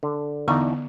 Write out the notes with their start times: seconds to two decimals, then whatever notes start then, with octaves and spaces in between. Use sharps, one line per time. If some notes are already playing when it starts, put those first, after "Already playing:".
0.03 D3
0.48 E2 D3 B3 D4 D#4 C#6